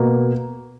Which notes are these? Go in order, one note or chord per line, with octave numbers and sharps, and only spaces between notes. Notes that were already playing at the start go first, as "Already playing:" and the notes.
Already playing: B2 A#3